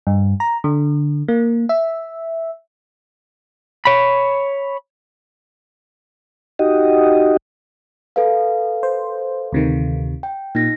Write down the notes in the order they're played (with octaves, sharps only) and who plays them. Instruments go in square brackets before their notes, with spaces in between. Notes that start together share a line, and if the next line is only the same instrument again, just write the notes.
[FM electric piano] G2
A#5
D3
A#3
E5
[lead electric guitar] C#5 B5
[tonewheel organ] D#4 F#4 G4 D#5
[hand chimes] A4 B4 F5
[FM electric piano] C5
D2 C3 D#3
[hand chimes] G5
[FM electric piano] A#2 [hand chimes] D#4 A#6